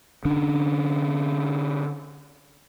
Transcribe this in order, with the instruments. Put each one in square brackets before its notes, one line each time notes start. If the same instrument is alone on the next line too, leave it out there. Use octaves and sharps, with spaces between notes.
[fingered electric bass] D3 C#4 D4